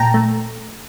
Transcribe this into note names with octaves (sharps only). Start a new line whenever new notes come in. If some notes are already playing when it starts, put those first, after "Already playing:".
Already playing: A#2 A3 G5 A5 A#5
A3